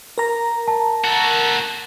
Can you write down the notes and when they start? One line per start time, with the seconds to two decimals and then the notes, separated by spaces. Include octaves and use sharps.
0.18 A#4 A#5
0.68 A5
1.04 F#4 A4